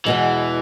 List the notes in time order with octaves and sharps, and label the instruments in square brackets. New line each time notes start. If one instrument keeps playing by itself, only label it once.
[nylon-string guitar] E2 B2 G#3 [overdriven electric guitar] E3